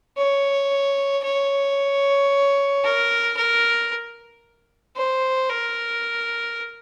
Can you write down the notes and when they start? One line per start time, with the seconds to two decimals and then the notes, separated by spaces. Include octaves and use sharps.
0.17 C#5
1.23 C#5
2.83 A#4
3.36 A#4
4.96 C5
5.49 A#4